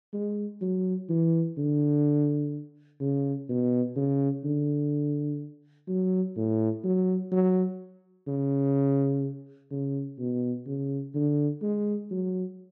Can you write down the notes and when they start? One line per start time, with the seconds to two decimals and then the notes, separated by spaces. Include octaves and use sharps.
0.13 G#3
0.61 F#3
1.09 E3
1.57 D3
3.00 C#3
3.49 B2
3.96 C#3
4.44 D3
5.88 F#3
6.36 A2
6.84 F#3
7.32 F#3
8.27 C#3
9.71 C#3
10.19 B2
10.66 C#3
11.15 D3
11.62 G#3
12.11 F#3